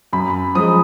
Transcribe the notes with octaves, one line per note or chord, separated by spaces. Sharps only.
F#2 B5
F3 G#3 D#6